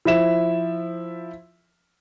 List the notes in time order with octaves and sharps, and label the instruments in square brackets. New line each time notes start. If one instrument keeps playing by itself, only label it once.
[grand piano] F3 E4 E5 E7